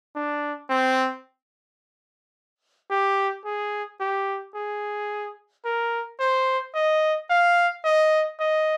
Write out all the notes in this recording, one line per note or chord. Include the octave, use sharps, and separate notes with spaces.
D4
C4
G4
G#4
G4
G#4
A#4
C5
D#5
F5
D#5
D#5